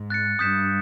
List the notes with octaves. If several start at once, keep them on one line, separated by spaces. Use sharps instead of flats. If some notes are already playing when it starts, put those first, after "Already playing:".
Already playing: G#2
F#6 A6 C#7
G2 D#6 G6 B6 E7